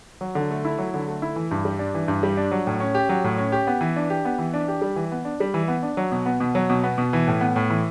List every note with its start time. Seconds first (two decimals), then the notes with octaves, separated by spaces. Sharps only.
0.21 F#3
0.35 D3
0.51 A3
0.65 E4
0.78 F#3
0.94 D3
1.08 A3
1.22 E4
1.36 E3
1.51 G2
1.65 G3
1.79 D4
1.95 E3
2.08 G2
2.23 G3
2.37 D4
2.51 F#3
2.67 A2
2.80 C#4
2.95 G4
3.09 F#3
3.24 A2
3.38 C#4
3.52 G4
3.67 B3
3.81 E3
3.96 D4
4.10 G4
4.25 B3
4.38 E3
4.53 D4
4.68 G4
4.82 G3
4.96 E3
5.12 B3
5.25 D4
5.40 G3
5.54 E3
5.68 B3
5.83 D4
5.97 F#3
6.12 B2
6.26 B3
6.40 B2
6.55 F#3
6.70 B2
6.83 B3
6.98 B2
7.13 E3
7.28 A2
7.41 B3
7.56 A2
7.70 E3